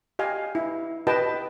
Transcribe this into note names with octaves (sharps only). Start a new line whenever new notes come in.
G4 D#5 F5 G#5
E4
G4 B4 D#5 G5 A5